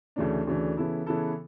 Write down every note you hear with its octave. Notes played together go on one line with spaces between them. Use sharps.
D2 C#3 E3 A3 D4
D2 C#3 E3 A3 D4
C#3 E3 B3 E4 A4
C#3 E3 B3 E4 A4